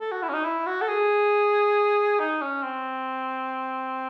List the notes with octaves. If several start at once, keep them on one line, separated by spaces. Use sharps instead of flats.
A4
F#4
E4
C#4
D#4
E4
F#4
A4
G#4
D#4
C#4
C4